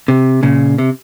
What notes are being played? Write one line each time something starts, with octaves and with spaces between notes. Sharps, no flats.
C3
A#2 C#3
C3